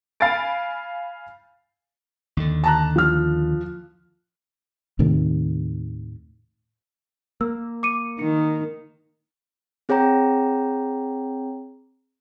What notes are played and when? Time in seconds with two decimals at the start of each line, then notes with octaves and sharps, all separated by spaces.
0.20 F5 G#5 B5 A6 D7
2.37 D#2 D3
2.64 A5 A#5 F#6
2.96 F3 F6
4.99 D#2 A2 C3 D#3
7.41 A#3 E6
7.83 D6 C#7 D#7
8.19 D#3 C#7
9.89 C4 G#4 C#5 G5 A#5